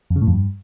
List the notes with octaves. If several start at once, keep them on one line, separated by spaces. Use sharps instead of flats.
F2
C#3
A2
F2
G2